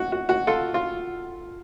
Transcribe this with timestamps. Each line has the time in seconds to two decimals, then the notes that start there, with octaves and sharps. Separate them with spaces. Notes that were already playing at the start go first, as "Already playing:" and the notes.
Already playing: F#4
0.12 F#4
0.29 F#4
0.47 F4 A4
0.74 F4